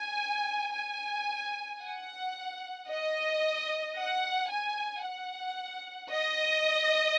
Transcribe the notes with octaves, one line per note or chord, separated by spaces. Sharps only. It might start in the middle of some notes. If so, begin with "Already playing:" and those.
Already playing: G#5
G#5
F#5
D#5
F#5
G#5
F#5
D#5